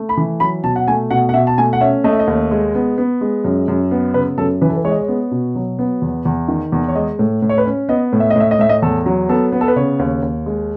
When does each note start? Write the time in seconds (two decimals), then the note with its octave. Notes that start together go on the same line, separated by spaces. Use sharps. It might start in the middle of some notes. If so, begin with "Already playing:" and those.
Already playing: A3
0.09 B5
0.17 E3
0.40 F#3 B5
0.64 B2 A5
0.76 F#5
0.87 A3 G#5
1.11 B2 F#5
1.29 F#5
1.34 B2 E5
1.47 A5
1.58 A3 G#5
1.73 F#5
1.81 C#4 E5
2.04 A3 D#5
2.12 E5
2.19 D#5
2.27 D#2
2.51 G#3
2.75 B3
2.98 B3
3.21 G#3
3.45 F#2
3.68 F#2
3.91 B3
4.14 C#3 B4
4.38 F#2 A4
4.61 E3 B4
4.69 A4
4.76 B4
4.85 G#3 C#5
4.92 D#5
4.99 C#5
5.08 B3
5.31 B2
5.55 F#3
5.79 B3
6.02 E2
6.25 E2
6.48 D#3
6.72 E2
6.88 C#5
6.95 G#3 D#5
7.19 A2
7.42 A2
7.49 C#5
7.58 B4
7.66 C#4
7.89 B3 D#5
8.13 A2
8.20 E5
8.30 D#5
8.36 A2 E5
8.51 D#5
8.59 A2 E5
8.69 D#5
8.82 E2 A4
9.06 F#3
9.29 B3 A4
9.52 B3
9.61 A4
9.68 B4
9.76 C#3 C#5
9.99 D#2
10.22 D#2
10.46 G#3